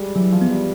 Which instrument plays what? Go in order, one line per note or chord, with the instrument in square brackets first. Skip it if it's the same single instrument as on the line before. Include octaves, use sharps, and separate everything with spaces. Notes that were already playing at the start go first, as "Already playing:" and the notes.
Already playing: [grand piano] G3 G#3
[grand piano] E3 [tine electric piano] F#3
[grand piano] F3
[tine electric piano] B3
[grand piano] G3